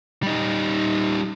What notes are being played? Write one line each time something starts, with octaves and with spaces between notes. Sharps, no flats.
G3 D#4